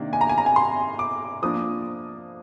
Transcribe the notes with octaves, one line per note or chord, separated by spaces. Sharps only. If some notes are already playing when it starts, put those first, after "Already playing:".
Already playing: C3 D#3 A#3 D4
G#5
A#5
G#5
A#5
G#5
C6
D6
F3 A#3 D4 D#6